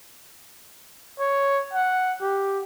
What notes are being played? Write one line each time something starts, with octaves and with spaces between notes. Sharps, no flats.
C#5
F#5
G4